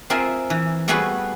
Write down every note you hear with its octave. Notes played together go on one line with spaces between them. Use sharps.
C4 F4 G#4 A#4 E5
E3
G3 A3 B3 F#4 G#4 B4